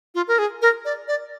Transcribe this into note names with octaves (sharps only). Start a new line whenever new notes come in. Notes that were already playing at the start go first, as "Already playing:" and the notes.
F4
A#4
G#4
A#4
D5
D5